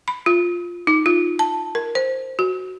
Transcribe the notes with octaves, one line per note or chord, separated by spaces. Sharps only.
B5
F4
D#4
F4
A5
A#4
C5
F#4